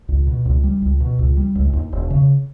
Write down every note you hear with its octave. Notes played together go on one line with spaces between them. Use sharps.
C#2
B2
C#2
G3
C#2
B2
C#2
G3
C#2
D#2
E1
C#3